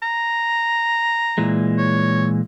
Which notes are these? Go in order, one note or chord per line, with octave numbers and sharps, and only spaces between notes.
A#5
A#2 E3 G#3
C#5